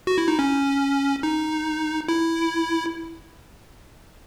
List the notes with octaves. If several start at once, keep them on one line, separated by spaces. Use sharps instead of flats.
F#4
E4
D#4
C#4
D#4
E4